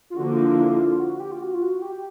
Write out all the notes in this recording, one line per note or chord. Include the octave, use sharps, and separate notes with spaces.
F4
D3 F3 A#3 F#4
E4
E4
F4
F#4
G4
F4
F#4
F4
F#4
G4